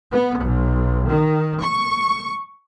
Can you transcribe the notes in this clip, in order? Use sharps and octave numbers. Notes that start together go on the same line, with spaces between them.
B3
B1
D#3
C#6